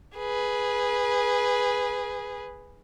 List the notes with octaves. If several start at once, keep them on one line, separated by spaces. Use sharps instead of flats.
G#4 B4